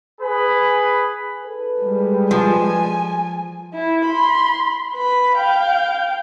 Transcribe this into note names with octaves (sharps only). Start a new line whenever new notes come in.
G#4 B4 B5
E4 A4 B4
G3 G#3
F3 G#5
E4
B5 C6
B4 B5
F5 G5